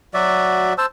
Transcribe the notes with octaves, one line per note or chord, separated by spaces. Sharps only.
F#3 F#4 D5 E5
C5 A5 E6